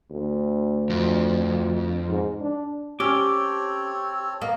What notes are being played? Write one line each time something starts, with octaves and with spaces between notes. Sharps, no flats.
D2
F2
G#2
D4
C4 C#4 G4 A4 C#5 D6
A#3 B3 D#5